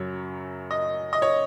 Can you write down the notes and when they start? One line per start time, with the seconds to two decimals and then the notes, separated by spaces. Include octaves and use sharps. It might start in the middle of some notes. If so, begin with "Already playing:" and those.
Already playing: F#2 C#3 F#3 C#5
0.71 D#5
1.13 D#5
1.22 C#5